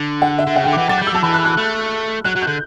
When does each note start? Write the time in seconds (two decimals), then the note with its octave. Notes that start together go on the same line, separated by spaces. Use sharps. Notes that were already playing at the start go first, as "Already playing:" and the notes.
Already playing: D3
0.22 F#5
0.38 E5
0.47 D3
0.56 C#3 F#5
0.64 G5
0.66 D3
0.73 D6
0.78 E3
0.89 F#3 A6
0.98 G6
1.01 G3
1.07 E6
1.12 F#3 A5
1.23 E3 B5
1.34 F#6
1.45 F#6
1.57 A3
2.24 F#3 F#6
2.36 F#3
2.42 G6
2.47 D3